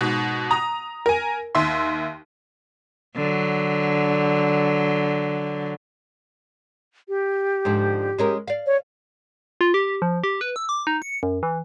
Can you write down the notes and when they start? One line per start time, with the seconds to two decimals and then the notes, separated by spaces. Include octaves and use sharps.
0.01 G#2 B2
0.51 A#5 D#6
1.06 A#4 G#5
1.55 D#2 E5 C6
3.16 D3 F#3
7.09 G4
7.65 G#2 D3 F3
8.18 G#3 C#4 A#4
8.48 D5 F5
8.66 C#5
9.61 F4
9.74 G4
10.02 F3
10.24 G4
10.41 B4
10.56 E6
10.69 D6
10.87 D#4
11.02 C#7
11.23 F#2
11.43 E3